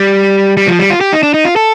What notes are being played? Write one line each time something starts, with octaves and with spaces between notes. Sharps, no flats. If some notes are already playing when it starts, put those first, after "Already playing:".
Already playing: G3
G3
F3
G3
F4
G4
D#4
D4
D#4
F4
A4